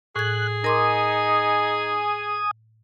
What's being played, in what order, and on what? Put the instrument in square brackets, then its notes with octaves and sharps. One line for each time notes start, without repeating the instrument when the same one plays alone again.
[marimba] A2 G#6 [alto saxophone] G#4 [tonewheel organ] F#6
[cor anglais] D#4 [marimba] A#4 C6 D6 [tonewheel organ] G#5 D#6